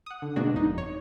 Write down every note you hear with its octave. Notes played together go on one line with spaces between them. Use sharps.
F#5 D#6
D3
B2 G#3 A#3 D4 F#4
G1 F2 D#4
C#5